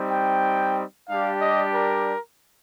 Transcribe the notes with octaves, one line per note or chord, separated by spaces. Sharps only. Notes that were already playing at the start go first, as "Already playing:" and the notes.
Already playing: G3 C4 D#4
G5
G3 D4 G4 F5
D#5
A#4